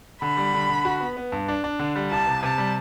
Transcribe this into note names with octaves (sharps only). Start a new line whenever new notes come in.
D3 B5
G3
D3
D3
F#4
B3
B3
G2
D4
D4
D3
G3
C2 A5
C3
C3 A5
G3